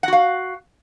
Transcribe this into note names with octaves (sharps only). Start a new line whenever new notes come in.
F#4 F5 F#5